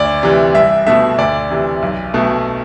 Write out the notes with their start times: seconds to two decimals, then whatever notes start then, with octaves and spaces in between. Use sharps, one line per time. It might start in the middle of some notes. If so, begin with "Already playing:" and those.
Already playing: D2 D5
0.23 C3 E3
0.54 C2 E5
0.87 B2 A3 E5
1.18 D2 D5
1.51 C3 E3
1.82 B1
2.14 B2 A3